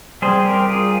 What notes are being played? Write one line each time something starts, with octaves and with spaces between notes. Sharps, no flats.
G3 C4 G#4 C5
G4 A#4
F4 G#4